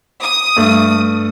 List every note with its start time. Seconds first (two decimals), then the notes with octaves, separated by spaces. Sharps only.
0.23 D#6
0.56 G2 A3